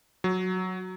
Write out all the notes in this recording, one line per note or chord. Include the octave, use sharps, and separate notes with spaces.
F#3